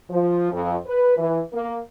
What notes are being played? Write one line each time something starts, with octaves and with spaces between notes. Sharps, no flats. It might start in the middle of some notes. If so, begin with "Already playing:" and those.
F3
F2
B4
E3
A#3